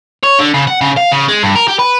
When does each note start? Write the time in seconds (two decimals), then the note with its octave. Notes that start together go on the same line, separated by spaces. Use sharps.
0.24 C#5
0.39 D3
0.54 C#3
0.67 F#5
0.81 C#3
0.97 F5
1.12 C#3
1.28 G#3
1.43 G2
1.56 A#4
1.68 G4
1.79 B4